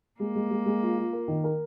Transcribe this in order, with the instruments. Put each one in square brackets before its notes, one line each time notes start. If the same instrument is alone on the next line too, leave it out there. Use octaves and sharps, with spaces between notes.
[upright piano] G#3 [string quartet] A#3
[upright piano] G#3
G#3
G#3
F4
F4
A#4
D#3
A#4